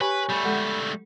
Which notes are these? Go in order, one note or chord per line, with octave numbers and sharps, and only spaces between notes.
G4 B4 C#5 G#5 C#6
G3 A3 B5
G#3 A4 F#5